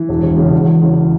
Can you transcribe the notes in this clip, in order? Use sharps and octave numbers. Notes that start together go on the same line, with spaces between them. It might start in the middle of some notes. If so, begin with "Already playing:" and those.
Already playing: E3
E1
E1
C#3
E2
E3
C#3